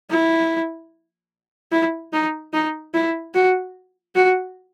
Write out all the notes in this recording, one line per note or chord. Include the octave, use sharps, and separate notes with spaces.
E4
E4
D#4
D#4
E4
F#4
F#4